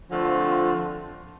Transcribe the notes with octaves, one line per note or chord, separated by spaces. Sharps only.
D3 F3 A3 C4 F4